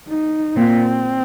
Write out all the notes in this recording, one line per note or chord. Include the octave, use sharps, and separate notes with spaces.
D#4
A#2 C4